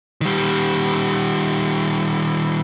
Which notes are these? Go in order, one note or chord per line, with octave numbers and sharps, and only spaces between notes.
D#3 G3